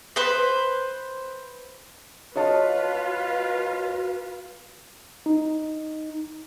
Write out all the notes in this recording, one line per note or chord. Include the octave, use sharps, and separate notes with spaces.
B4 C5
F4 F#4 B4 C#5 D#5 A5
D#4